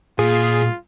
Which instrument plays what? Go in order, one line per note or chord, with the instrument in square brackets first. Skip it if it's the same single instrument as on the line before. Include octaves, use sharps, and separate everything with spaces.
[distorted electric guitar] A#2 [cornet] F4 [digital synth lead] G#4